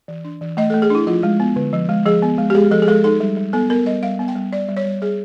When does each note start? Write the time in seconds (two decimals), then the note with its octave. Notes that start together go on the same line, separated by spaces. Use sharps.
0.08 E3
0.24 D4
0.41 E3
0.57 A3 D#5
0.70 A4
0.74 A3
0.82 G#4
0.90 D4 E4
1.07 F3 F4
1.23 G#3
1.40 B3
1.56 D3
1.73 F3
1.89 G#3
2.06 F3 G#4
2.22 B3
2.38 G#3
2.50 G4
2.55 G#3 G#4
2.71 F3 A4
2.82 G#4
2.88 G#3 A4
3.04 D#4 A4
3.20 G3
3.37 G3
3.53 B3 A4
3.70 B3 A#4
3.86 G3 D#5
4.03 G3 F5
4.19 B3
4.28 G5
4.36 G3
4.52 G3 D5
4.68 G3
4.77 C#5
4.86 G3
5.02 G3 G#4